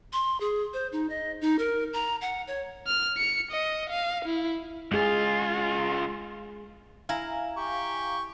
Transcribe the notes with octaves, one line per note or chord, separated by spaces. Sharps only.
C6
G#4
C5
D#4
D#5
D#4
A#4
A#5
F#5
C#5
F6
C#7
D#5
F5
E4
C#2 G#3 F4 G#4
E4 F5 G#5 A#5
G4 C#6